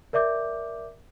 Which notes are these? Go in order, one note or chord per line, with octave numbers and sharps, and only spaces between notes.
A#4 D5 E5 D6 G6